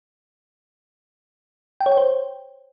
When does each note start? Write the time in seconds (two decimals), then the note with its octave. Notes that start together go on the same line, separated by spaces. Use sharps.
1.81 G5
1.86 C#5
1.92 G5
1.97 C5